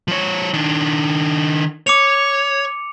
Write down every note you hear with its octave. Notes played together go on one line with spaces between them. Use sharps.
F3 C#5
D#3 D4
C#5 D6 C#7 F7